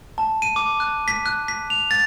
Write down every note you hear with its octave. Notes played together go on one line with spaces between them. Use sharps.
A5
D#7
D6
F#6
B6
F#6
B6
F7
A6